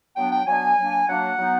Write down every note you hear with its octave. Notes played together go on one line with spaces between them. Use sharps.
F#3 B3 D4 G5
G5
F#3 B3 D4 G#5
F#3 A#3 D4
F#3 A#3 D4 F#5
F#3 B3 D#4